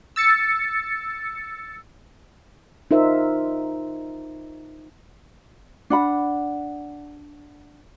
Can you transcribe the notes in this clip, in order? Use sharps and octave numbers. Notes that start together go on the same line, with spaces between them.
E6 A6 C#7
D#4 F4 A#4 C5 E5
D4 F#5 B5